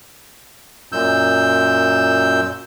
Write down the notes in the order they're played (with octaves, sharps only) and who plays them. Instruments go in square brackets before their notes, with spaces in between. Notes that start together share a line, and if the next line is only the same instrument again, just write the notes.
[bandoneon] F#2 A#2 E6 G6